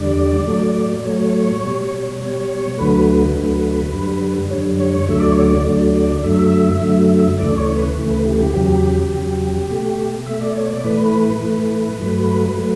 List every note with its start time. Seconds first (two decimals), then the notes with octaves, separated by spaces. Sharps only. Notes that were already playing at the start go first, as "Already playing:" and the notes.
Already playing: E2 D3 G3 D5
0.47 A2 F#3 A3
1.04 A2 F#3 A3 C#5
1.63 B2 G3
2.20 B2 G3 C#5
2.78 D2 D3 F#3 A3 B4
3.35 D2 D3 F#3 A3
3.93 F#2 D3 G3
4.50 F#2 D3 G3 C#5
4.79 C#5
4.93 C#5
5.08 D2 D3 F#3 A3 E5
5.20 D5
5.31 C#5
5.42 D5
5.65 D2 D3 F#3 A3
6.23 F#2 D3 F#3 A3 E5
6.81 F#2 D3 F#3 A3
7.39 D2 C#3 E3 A3 D5
7.58 C#5
7.77 B4
7.96 D2 C#3 E3 A3
8.11 B4
8.26 G4
8.40 G4
8.54 E2 C#3 F#3 G4
9.12 E2 C#3 F#3
9.69 B2 A3
10.26 B2 A3 E5
10.41 D5
10.55 C#5
10.70 D5
10.84 A2 E3 A3 B4
11.42 A2 E3 A3
12.00 G2 F#3 A3
12.57 F#3 A3